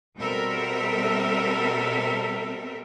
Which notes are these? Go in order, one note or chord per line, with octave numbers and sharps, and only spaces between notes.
B2 G3 C4 A4 A#4 E5